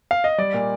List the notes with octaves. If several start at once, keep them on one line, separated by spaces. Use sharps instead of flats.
F5
D#5
G3 D5
A#2